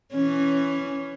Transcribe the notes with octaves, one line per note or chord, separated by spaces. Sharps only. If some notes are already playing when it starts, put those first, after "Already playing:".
E3 C#4